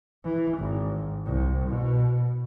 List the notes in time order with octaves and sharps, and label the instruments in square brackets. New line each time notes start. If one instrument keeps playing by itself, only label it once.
[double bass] E3
G#1
C2
B2